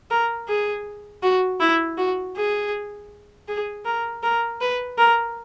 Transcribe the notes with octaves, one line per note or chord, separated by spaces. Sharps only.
A#4
G#4
F#4
E4
F#4
G#4
G#4
A#4
A#4
B4
A#4